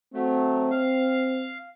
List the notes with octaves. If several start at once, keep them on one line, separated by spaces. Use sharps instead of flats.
F#3 A3 C4
F5